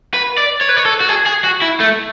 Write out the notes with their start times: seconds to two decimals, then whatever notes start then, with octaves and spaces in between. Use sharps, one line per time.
0.14 B4
0.38 D5
0.61 C#5
0.69 B4
0.77 C#5
0.85 A4
1.00 F#4
1.09 G#4
1.26 G#4
1.44 F#4
1.62 E4
1.80 A3